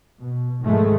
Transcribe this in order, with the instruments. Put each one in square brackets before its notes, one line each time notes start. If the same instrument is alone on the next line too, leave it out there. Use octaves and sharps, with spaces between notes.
[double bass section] B2
G#2 D#3 F3 G#3 A3